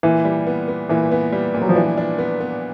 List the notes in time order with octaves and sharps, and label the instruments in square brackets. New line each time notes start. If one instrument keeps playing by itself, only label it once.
[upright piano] A#2 [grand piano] E3
[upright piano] G3
B3
B3
[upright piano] A#2 [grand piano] E3
[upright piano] B3
G3
A#2
[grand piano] F#3
F3
[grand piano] E3 [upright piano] D4
[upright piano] D4
B3
B3